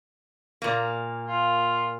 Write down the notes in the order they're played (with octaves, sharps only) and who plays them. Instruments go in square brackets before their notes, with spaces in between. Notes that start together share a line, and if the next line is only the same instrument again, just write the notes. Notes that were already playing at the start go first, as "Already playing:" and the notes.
[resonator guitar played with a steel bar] A#2 A#3
[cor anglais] F4